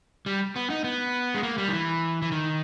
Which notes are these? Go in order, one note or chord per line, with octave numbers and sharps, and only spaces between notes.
G3
B3
D#4
B3
G#3
A#3
G3
D#3
E3
E3
D#3